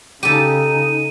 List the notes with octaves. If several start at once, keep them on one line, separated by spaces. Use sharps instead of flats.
C#3 D#4 G4 A4 D#7